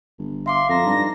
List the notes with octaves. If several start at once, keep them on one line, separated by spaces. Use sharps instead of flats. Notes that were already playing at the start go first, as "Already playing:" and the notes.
G1
E5 F5 C6 D6
F2 A4 A#5 A#6
G2 D#4